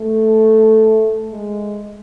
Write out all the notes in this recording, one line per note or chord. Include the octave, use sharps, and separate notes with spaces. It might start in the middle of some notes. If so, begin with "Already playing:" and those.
Already playing: A3
G#3